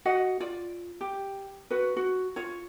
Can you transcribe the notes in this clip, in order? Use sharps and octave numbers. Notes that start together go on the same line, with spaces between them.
F#4 D#5 F#5
F4 D5
G4
F#4 B4
F#4
F4 C#5